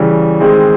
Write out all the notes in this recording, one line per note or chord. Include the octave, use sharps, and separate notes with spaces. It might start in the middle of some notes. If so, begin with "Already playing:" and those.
Already playing: C#3 E3 G3
D#3 G#3 C4